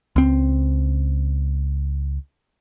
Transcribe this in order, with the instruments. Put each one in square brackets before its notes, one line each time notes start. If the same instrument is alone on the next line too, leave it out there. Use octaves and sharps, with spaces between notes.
[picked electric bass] C#2 C4